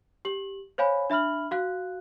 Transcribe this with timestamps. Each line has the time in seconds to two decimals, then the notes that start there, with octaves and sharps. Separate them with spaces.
0.25 G4 F#7
0.78 C5 C#5 F5 G#5 B5
1.10 D4 E5 B5 F6 F#7
1.51 F#4 F5 F#6